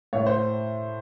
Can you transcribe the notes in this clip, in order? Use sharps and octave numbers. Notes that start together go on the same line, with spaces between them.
A2 C#5
C5